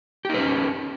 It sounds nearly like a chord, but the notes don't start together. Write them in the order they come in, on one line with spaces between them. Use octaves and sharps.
G4 D#4 B4 C#4